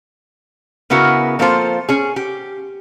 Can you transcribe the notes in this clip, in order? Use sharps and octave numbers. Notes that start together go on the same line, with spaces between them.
C#3 B3 C#4 E4 F#4 A#4
F3 A#3 C4 F4 A4 C5
C#4 G#4
G4